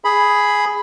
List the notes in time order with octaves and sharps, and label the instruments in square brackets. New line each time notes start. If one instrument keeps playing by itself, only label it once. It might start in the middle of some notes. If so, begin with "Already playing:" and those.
[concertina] G#4 B5